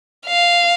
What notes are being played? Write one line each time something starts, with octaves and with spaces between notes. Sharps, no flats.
F5